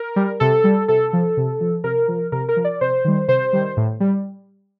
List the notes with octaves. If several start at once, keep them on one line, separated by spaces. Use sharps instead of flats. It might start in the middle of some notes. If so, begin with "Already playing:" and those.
Already playing: A#4
G3
C3 A4
G3
C3 A4
F3
C3
F3
C3 A#4
F3
C3 A#4
A#4
F3
D5
C3 C5
D#3 G3
C3 C5
D#3 G3
A2
G3